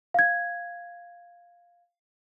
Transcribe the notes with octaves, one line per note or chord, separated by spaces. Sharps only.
F5 G#6